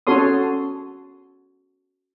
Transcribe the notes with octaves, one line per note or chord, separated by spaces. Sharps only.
C#4 F#4 A4 C#5 C6 D#6